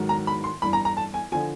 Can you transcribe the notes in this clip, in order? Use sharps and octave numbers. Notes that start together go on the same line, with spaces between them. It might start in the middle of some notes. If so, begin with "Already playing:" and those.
Already playing: G#2 D#3 F#3
A#5
B5
C6
G2 E3 B5
A#5
A#5
A5
G#5
D3 F3 G#5